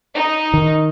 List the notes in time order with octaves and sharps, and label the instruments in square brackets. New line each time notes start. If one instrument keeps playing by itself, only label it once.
[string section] D#4
[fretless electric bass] D#3